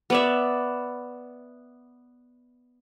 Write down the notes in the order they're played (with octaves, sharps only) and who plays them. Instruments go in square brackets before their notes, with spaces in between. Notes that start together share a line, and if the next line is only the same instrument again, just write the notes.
[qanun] B3 D5 E5